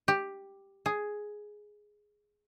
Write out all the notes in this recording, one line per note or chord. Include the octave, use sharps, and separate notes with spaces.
G4
G#4